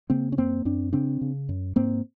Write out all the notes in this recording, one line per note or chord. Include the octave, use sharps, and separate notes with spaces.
C#3 A#3 C4
C#4
F#2 A#3 C4
F#2 C4 D4
C#3 C4 D4
C#3
F#2
G#2 A#3 C4